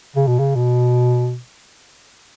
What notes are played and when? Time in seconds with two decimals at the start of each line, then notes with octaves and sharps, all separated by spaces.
0.16 C#3
0.27 B2
0.39 C#3
0.55 B2